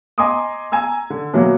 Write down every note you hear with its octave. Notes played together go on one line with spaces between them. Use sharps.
D#5 G#5 A#5 C6 D6 D#6
G#5 A#5 E6
D3
B2 E3 F#3 A#3